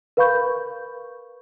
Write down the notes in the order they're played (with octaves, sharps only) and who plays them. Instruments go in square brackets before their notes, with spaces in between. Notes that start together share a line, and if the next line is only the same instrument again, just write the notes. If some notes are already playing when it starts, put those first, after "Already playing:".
[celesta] A#4 B4 F5 B5 C#6 G6